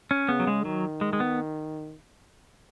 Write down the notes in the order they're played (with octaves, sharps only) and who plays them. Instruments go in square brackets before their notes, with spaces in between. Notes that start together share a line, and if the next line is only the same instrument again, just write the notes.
[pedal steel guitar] C#4
[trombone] C#3 [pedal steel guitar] B3
[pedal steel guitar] F#3
G#3
[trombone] D#3 [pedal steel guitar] F#3
[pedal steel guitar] G#3
G#3
B3